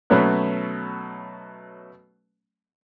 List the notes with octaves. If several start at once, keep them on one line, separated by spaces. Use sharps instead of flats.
B2 F#3 A3 B3 C#4 F#6